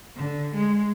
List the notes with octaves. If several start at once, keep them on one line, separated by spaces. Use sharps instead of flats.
D3
G#3